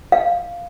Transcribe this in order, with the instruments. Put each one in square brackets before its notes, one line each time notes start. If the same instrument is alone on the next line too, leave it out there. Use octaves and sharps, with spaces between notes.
[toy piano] F5